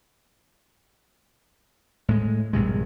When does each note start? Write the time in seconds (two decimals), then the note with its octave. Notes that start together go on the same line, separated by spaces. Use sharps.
2.08 A2 G#3
2.53 A#1 G2 C3 G#3